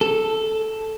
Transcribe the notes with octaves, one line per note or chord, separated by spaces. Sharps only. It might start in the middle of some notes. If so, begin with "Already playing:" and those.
A4